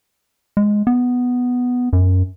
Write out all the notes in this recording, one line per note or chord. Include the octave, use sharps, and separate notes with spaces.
G#3
B3
F#2